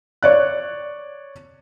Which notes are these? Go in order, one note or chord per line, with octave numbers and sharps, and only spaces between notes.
C#5 D5 F#6